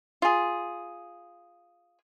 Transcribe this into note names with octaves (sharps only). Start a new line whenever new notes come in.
F4 G#4